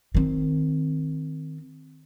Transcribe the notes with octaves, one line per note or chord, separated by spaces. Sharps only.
D#3 C4